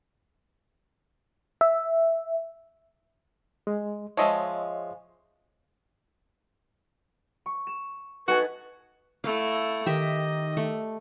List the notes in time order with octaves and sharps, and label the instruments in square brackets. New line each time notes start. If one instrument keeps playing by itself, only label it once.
[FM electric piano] E5
[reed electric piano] G#3
[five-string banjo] F3 G#3 [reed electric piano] C#5 D#5 E5
[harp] C#6
E7
[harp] D#4 A4 G#5 [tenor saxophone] F#4 [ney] B4
[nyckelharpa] A3 E4 [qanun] F5
[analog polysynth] D#3 [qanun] G4 E5 [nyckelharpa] D#5
[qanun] A3